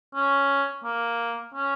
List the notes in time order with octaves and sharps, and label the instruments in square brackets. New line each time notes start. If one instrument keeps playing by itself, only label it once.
[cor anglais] C#4
A#3
C#4